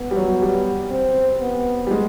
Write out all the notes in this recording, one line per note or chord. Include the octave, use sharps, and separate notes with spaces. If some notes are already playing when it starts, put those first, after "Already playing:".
Already playing: B3
G3
F#3
G3
C4
B3
G3
G#3